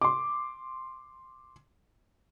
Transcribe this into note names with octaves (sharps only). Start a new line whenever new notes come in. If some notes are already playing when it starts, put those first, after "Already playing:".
C6 D6